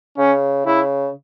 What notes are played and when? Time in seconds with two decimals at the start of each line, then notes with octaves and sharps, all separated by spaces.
0.18 C#3 C#4
0.66 C#3 E4